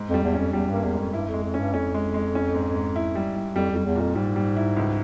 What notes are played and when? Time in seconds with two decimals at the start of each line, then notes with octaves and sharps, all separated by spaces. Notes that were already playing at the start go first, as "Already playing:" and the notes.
Already playing: G#2
0.09 F2
0.14 G3
0.24 E2
0.33 C#4
0.39 F2
0.53 E2 G3
0.69 G2 A#3
0.84 E2
0.93 G#2
0.99 F2
1.13 G2 E4
1.28 F2
1.33 G#3
1.44 F2
1.54 C#4
1.60 G2
1.74 F2 C#4
1.94 G#3
2.14 G#3
2.35 C#4
2.54 G#2
2.75 G#2
2.96 E4
3.15 G3
3.36 G3
3.56 F2 G3
3.71 F2 G3
3.86 E2
3.96 A#2
4.01 F2
4.15 G#2 G3
4.36 G3
4.57 E4
4.77 C#2